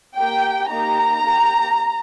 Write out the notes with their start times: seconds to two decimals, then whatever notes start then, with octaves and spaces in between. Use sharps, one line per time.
0.17 A#3 G4 G5
0.69 A#3 D#4 G4 A#5
1.21 A#3 G4